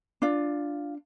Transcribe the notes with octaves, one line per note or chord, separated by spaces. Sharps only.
D4 F4